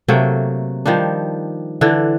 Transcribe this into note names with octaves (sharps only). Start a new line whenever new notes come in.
C3 F#3 A3 A#3
D#3 F3 G3 D4
D3 E3 D4